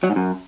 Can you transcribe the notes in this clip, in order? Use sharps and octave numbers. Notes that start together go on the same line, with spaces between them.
F#3
G#2
F#2